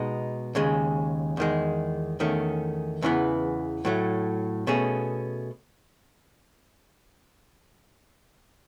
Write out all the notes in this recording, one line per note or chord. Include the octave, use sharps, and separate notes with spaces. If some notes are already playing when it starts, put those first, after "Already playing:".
Already playing: B2 G#3 D#4
D#2 C#3 G#3
E2 D#3 G#3
E2 D#3 A3 C#4
E2 C#3 E3 B3
A2 F#3 A3
B2 A3 C#4 G#4